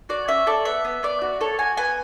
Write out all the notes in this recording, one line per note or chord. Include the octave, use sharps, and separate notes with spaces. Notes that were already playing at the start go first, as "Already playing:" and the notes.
F#4 D5
C#4 E5
A4 D5
B3 E5
B3
B3 D5
F#4
A4 C#5
F#4 G#5
B3 G#5